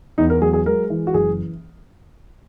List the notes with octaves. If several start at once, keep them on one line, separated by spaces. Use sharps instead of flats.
E2 D#4
A#4
F#3 G#4
G#4
G#3 A#4
E3
F#4
F#1 G#4